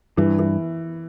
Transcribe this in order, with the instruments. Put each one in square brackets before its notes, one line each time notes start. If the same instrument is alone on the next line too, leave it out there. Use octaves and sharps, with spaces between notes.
[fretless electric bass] G2 [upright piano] E3
[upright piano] E3